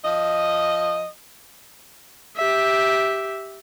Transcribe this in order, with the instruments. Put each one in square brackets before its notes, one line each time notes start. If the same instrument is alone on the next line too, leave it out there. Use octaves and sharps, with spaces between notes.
[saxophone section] F3 D#5
[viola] G4 E5